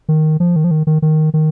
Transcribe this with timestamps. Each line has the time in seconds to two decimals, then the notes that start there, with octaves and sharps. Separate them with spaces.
0.09 D#3
0.40 F3
0.56 D#3
0.64 F3
0.71 D#3
0.87 D#3
1.02 D#3
1.34 D#3